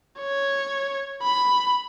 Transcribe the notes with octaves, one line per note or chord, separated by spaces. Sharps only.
C#5
B5